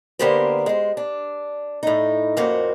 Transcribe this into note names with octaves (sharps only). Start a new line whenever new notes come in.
D3 A#3 B3 G4 A#4 C5
G#3 C5
D4
A2 D#4
F2 A2 A#3 C#4 F#4 C5